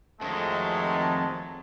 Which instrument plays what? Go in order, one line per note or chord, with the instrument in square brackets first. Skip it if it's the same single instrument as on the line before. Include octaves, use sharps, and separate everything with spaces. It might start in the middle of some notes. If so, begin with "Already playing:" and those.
[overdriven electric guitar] F2 [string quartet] D#3 F#3 [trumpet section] G#3 A3 [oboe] A5